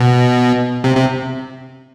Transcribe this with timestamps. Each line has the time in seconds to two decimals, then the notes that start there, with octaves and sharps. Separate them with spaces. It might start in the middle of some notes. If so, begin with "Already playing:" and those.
Already playing: B2
0.84 C3
0.96 C3